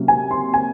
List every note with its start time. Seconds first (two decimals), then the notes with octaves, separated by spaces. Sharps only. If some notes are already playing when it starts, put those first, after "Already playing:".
Already playing: C3 F#3 A#3 C#4
0.08 G#5
0.31 C6
0.54 G#5